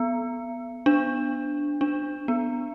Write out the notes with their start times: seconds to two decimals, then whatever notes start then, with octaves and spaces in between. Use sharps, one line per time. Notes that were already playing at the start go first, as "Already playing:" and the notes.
Already playing: B3
0.86 D4
1.81 D4
2.28 B3